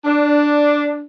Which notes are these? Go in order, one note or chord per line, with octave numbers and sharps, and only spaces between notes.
D4